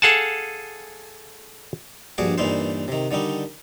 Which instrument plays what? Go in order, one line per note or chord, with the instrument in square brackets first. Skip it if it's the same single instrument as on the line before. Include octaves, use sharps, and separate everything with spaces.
[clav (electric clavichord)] G#4 A4 F5 F#5 G#5 A5
[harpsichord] A#1 G2 F#4 G#4 D6
G2 A#2 E3 D#4 C5
C3 D#3
D3 D#3 G3 D#4